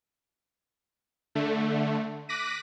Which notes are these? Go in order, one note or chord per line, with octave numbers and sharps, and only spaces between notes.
D3 A3
D6 F#6 A#6 B6 D#7